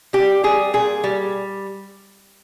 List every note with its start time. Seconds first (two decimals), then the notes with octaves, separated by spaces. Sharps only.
0.13 G3 G4
0.44 G3 G#4
0.73 A#2 G#4
1.04 G3